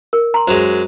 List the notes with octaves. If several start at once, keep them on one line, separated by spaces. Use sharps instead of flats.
A#4
A#5 C6
F#2 F#3 G#3 C5